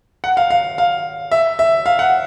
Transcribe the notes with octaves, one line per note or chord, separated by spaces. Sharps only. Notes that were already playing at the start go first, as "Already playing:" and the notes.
F#5
F5
F5
F5
E5
E5
F5
F#5